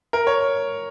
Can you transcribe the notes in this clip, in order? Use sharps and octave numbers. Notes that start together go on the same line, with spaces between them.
A#4
C#5